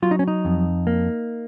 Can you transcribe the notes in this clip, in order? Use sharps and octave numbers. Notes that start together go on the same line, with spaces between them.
F#3 F4
D#4
C#4
D#4
F2
A#3